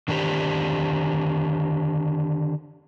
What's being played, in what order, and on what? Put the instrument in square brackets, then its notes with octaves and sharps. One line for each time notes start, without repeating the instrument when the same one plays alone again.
[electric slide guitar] D3 D#3 D4 G4 C5